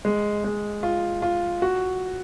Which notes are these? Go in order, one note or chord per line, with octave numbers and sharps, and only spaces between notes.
G#3
G#3
F4
F4
F#4